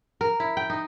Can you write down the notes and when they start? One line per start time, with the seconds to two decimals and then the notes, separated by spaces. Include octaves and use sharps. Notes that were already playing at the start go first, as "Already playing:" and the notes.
0.21 A#4
0.40 E4
0.57 G5
0.70 D#4